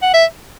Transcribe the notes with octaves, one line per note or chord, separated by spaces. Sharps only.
F#5
E5